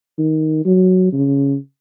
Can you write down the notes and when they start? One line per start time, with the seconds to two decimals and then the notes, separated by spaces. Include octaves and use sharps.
0.18 D#3
0.65 F#3
1.13 C#3